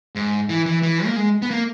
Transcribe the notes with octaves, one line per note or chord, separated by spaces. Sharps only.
G#2
E3
E3
E3
A#3
G#3
B3
A#3